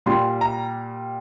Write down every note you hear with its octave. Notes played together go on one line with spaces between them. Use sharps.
A#2 G3 C6
A#5